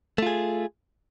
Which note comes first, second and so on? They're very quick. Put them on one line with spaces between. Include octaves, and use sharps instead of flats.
A3 F4 G#4